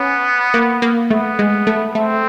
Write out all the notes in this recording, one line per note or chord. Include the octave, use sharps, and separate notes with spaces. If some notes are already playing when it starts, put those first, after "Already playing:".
Already playing: B3 C#4
A#3
A#3
A3 B3
G#3
A3
A3 C4